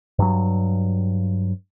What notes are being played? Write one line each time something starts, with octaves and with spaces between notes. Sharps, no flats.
G2 F#3